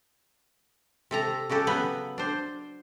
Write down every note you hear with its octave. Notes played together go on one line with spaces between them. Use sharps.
C3 A4 A#5
C#3 F#4 G4 A4
C#3 F#3 B3 B4
D4 C5